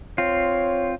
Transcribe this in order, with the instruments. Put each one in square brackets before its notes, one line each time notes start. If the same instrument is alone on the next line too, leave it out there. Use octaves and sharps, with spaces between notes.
[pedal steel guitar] C4 F4 [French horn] C#5